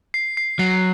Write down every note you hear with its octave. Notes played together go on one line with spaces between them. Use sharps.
C7
C7
F#3 C7
C7